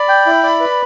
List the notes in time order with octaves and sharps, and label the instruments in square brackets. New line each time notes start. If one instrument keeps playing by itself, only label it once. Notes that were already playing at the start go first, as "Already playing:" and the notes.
Already playing: [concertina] D5 [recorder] B5
[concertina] G5
E4
D5
B4